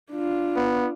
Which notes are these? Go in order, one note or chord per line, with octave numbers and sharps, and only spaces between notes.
D4 F4
B3